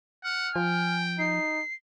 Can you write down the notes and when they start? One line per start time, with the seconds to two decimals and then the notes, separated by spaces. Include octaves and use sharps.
0.24 F#5 F6
0.56 F3 G5 G#5
1.19 D#4 C7